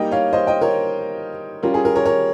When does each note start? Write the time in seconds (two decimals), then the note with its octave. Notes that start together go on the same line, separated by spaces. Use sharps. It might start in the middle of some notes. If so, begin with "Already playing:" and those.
Already playing: G3 A#3 D#4 D#5 G5
0.11 C#5 F5
0.33 C5 D#5
0.47 D#5 G5
0.61 A#4 C#5
1.63 G3 C#4 F4 A#4
1.74 G#4
1.85 A#4
1.95 A#4 C#5
2.05 A#4 C#5